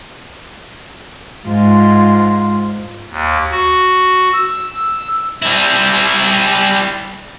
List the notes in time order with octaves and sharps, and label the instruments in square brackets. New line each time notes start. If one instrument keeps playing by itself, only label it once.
[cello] G#2 F4
[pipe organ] D#2
F#4
E6
[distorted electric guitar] G3 E4